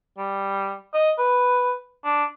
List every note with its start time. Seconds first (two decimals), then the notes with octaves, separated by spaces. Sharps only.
0.18 G3
0.94 D#5
1.19 B4
2.05 D4